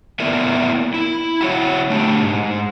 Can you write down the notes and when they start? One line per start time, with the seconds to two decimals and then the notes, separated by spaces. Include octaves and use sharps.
0.20 A#3 B3 E4 A#4 D5 E5
0.94 E4
1.41 E4 F#4 C#5
1.90 A3 D4 G4
2.22 G#2